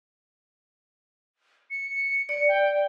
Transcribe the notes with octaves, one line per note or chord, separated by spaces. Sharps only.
C#7
D5 C#7
G5